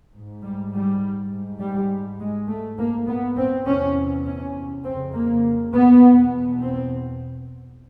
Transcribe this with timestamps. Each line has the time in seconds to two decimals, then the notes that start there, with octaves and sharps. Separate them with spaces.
0.13 G#2
0.42 G3
0.72 G3
1.30 G#2
1.61 G3
2.20 G#3
2.48 G#2 A3
2.78 A#3
3.08 B3
3.37 C4
3.67 E2 C3 C#4
4.26 C#4
4.84 F2 C#3 C4
5.14 A#3
5.74 B3
6.02 E2 B2
6.61 C4